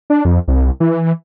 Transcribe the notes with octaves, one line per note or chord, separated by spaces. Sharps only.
D4
F2
C2
E3